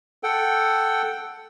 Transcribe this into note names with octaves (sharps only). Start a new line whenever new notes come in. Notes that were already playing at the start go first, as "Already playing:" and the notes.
A4 F#5 G5